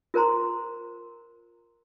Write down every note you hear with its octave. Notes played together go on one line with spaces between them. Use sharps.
F4 A#4 C5 A#5 C6